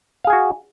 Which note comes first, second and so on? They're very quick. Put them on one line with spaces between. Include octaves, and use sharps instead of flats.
F5 G#4 G#5 F#4